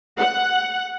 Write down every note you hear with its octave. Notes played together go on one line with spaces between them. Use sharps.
F#5